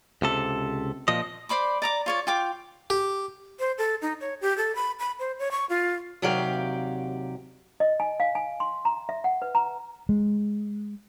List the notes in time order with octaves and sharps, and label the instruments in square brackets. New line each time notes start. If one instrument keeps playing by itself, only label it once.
[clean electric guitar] C#2 C3 A4
A#2 F3 D#5
[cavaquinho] C5 D5 B5 D6
D5 A#5 D6
F4 C#5 D5
F4 G5 D6
[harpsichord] G4
[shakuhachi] C5
A4
D#4
C#5
G4
A4
B5
B5
C5
C#5
C#6
F4
[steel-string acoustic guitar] D#2 C3 F#3 G4 D5 F5
[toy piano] D#5
G#5
F5
G#5
C6
A#5
E5
F#5
B4
A#5
[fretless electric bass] G#3